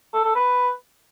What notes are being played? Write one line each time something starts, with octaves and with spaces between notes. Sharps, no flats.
A4
A4
B4